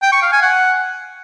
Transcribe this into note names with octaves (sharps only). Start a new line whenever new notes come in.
G5
C#6
F5
G#5
F#5